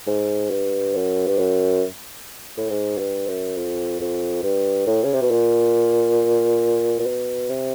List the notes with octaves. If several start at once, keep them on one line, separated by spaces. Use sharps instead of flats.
G#2
G2
F#2
G2
F#2
A2
G#2
G2
F#2
F2
F2
G2
A2
C#3
C3
B2
A#2
A#2
B2
C3